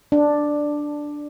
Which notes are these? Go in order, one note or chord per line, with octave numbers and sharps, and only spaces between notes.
D4